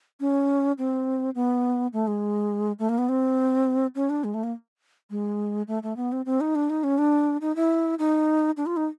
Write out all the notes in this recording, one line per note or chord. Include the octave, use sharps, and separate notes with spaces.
C#4
C4
B3
A3
G#3
A3
A#3
B3
C4
C#4
D4
G#3
A3
A#3
G#3
A3
A3
B3
C4
C4
D#4
D4
D#4
C#4
D4
D#4
E4
D#4
D4
F4
D#4